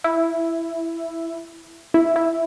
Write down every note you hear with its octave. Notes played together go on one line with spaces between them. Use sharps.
E4
E4
E4